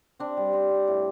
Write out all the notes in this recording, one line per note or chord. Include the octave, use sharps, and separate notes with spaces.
C4 D4
G3
C4
C4
A2